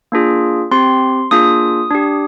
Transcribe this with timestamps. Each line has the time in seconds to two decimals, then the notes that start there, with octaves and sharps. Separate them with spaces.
0.12 A#3 D4 F4 G#4
0.71 C4 G4 C6
1.31 A#3 D4 F4 G#4 D#6
1.91 D4 G4